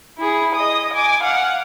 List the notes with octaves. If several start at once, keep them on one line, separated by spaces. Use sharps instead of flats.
E4 G#4
D#5 D#6
G#5 D6
F5 F#5